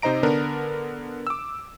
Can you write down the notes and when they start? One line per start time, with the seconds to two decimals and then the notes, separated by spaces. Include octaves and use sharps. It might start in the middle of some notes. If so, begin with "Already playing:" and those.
0.02 C3 D#4 C5 D#5 A#5 D7
0.23 D3 B3 D4 A#4
1.27 D6 E6